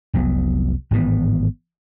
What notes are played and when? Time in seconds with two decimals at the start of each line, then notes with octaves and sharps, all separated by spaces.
0.13 F1 C2 F#3 B3
0.91 G#1 A2 E3 B3